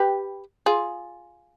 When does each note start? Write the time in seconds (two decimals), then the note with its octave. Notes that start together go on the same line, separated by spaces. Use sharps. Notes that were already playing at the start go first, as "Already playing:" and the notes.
Already playing: G4 B4
0.66 F4 G#4